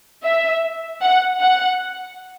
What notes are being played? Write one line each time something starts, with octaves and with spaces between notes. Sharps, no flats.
E5
F#5
F#5